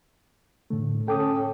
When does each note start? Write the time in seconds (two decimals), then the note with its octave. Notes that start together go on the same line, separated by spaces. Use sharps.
0.70 A2 D3 A3
1.08 C#4 A4 G5 D6 D#6